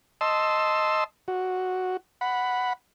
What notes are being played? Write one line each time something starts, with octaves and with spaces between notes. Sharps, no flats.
D#5 A5 C6 E6
F#4
F#5 B5